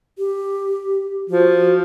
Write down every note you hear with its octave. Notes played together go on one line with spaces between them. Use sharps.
G4
F3 F#4